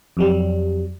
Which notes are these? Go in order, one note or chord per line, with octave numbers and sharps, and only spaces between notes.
F2 F#3 G3